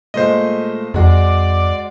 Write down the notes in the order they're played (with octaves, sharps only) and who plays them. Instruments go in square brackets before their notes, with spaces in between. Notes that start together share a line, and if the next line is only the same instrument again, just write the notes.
[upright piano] A#2 G#3 A3 [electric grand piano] C5 D#5
[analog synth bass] F2 [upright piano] G#3 F#4 [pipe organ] D5